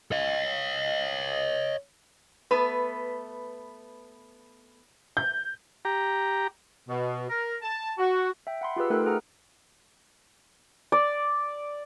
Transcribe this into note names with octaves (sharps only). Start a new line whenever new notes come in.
C#5 D#5
A3 B3 B4
G6
G4 A#5
B2
A#4
A5
F#4
E5 G5
F#5 B5 C6
F4 G4 G#4 B4 E6
A3 D#4 A4 A#4 G5 F#6
G#4 F#5 A#5 F6
D5